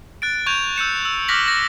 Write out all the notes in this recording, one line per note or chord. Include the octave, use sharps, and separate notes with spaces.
F#6 A6 D7
C#6 G6 G#6 F7
E6 G6 C#7 E7
E6
D6 F6 F#6 A#6 B6 F#7
A#6